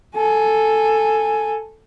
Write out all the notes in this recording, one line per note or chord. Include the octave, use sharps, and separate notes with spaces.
A4 G#5